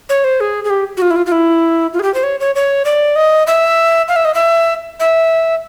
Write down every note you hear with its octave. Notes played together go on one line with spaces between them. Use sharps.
C#5
C5
G#4
G#4
G4
F#4
F4
E4
F4
F4
E4
F4
G#4
G4
C5
C#5
C#5
C#5
D5
D#5
E5
F5
E5
D#5
E5
E5